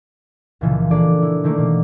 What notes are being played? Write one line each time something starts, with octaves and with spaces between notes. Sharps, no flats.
C#2 A#2 C#3 E3 F3
A#3 D4 G#4 A4 D5
E4
D#3 E3 A3 A#3 D5
B2 A#3